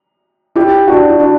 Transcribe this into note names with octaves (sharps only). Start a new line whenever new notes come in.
E4 G4
D4 F#4
E4
D4 F#4